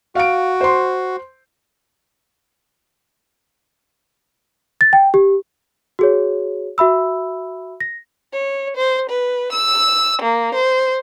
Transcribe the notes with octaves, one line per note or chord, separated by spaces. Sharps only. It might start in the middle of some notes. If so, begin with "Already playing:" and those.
F#4 F5 D7
C5 C6
A6
G5
G4
F#4 G#4 C#5
F#4 E5 B5 E6
A#6
C#5
C5
B4
E6
A#3
C5